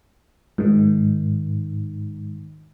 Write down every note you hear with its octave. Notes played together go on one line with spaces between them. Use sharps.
G#2 D#3